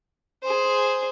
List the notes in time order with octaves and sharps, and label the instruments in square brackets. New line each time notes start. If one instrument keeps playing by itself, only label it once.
[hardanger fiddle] G#4 C5